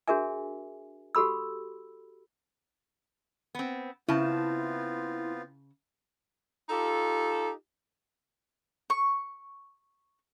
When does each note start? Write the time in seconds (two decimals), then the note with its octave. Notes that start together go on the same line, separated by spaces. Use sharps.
0.08 D4 F#4 G#4 A#4 E5 G#5
1.15 F#4 G4 A4 B5 E6
3.55 B3 C4
4.08 C#3 B3 C4 E4 F4 A5
6.70 D#4 F4 G4 A4
8.90 C#6